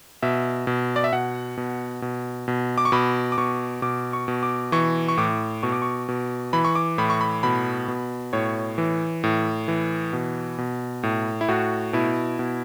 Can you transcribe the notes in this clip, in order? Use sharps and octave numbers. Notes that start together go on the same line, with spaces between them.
B2 E5
B2
D5
E5
B2 F#5
B2
B2
B2
D6
C#6
B2 B5
D6
B2 C#6
B2 D6
C#6
B2
D6
E3 C#6
C#6
A2 D6
B2 C#6
D6
C#6
B2
E3 B5
C#6
D6
A2 B5
C#6
B5
B2 B5
B2
A2 C#5
E3
A2
E3
B2
B2
A2
E4
A2 F#4
B2 E4
B2